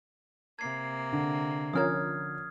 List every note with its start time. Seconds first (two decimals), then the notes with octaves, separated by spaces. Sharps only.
0.59 C3 A#3 G#6 C7
1.12 D3
1.73 F3 C#4 A#4 D#6 F6 G#6